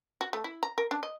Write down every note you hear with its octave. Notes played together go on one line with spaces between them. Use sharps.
F#4
A3
E4
A#5
A#4
D4
D#5